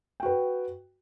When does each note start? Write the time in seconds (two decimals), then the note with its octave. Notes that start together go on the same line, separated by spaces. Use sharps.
0.20 G5
0.23 F#4
0.26 B4